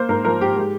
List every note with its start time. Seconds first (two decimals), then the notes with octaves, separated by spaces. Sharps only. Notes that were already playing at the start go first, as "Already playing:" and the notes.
Already playing: A#3 C5
0.09 G#2 A#4
0.25 F3 A#4
0.41 G#2 G4
0.56 G#3 G4